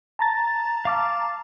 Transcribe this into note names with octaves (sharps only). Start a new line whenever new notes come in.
A5 A#5 A6
F5 D6 F6